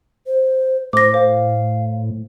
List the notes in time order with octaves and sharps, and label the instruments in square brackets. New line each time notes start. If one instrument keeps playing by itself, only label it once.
[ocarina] C5
[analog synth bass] A2 [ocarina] C5 [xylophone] D6 A#6
[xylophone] C5 [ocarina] F5